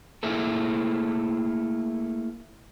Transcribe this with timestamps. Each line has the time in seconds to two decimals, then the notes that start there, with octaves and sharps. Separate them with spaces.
0.23 A3 A#3 E4 G#4 A4